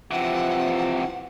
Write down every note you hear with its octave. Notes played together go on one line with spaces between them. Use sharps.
C3 E3 F3 F#5